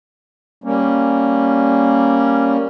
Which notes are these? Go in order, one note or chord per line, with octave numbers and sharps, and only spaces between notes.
G3 A#3 C#4